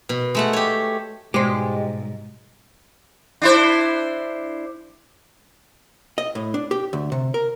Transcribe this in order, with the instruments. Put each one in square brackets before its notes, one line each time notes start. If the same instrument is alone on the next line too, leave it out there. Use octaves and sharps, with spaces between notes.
[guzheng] B2
G#3 A3 F#5
G4 C#5
[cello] G#2 [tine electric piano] B2 G3 [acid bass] G#3 [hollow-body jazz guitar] G4 C5
[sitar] D4 E4 C5
[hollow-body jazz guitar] D#5
A2
D4
G4
D2
C3
A#4